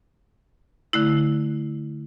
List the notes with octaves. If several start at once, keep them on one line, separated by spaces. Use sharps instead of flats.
D3 A3 E4